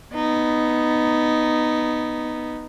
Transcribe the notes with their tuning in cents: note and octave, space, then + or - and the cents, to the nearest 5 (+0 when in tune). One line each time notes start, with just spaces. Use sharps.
B3 +0 D#4 -5